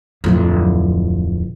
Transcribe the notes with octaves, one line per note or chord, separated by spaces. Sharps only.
D1 F2